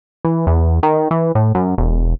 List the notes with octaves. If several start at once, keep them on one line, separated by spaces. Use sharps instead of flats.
E3
E2
D#3
E3
A2
F#2
E1